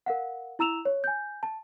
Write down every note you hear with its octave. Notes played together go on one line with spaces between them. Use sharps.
A#4 F5 F#5
E4 A#5 E6 E7 F7
C#5
G#5 G6
A5